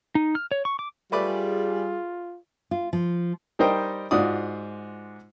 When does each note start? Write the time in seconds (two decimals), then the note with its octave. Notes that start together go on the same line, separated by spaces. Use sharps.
0.15 D#4
0.35 F6
0.51 C#5
0.65 C#6
0.79 D6
1.12 G3 A3 F4 G#4 B4 D5
2.71 F4
2.93 F3
3.59 G3 D#4 A#4 C5 D#5 G5
4.11 G#2 F4 F#4 D5 D#6